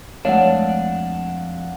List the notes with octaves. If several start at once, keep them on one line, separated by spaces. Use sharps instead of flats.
F2 G#3 A3 D4 C#5 F5 F#5